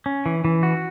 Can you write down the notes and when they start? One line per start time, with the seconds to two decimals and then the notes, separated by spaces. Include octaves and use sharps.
0.06 C#4
0.26 E3
0.45 E3
0.63 F#4